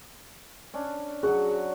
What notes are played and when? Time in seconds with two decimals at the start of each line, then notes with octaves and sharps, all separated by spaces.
0.74 C#4 D4
1.23 F#3 F#4 G#4